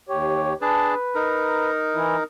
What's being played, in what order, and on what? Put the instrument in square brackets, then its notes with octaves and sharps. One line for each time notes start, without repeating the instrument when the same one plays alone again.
[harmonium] D#2 G4 C#5
[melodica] D4 G#4 A5 [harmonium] B4
[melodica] D#4 A#4
[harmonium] E3 E4